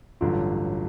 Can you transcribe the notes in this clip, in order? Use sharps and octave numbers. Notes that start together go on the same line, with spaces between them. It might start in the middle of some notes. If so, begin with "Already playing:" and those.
A1 G2 D3 F#3 F4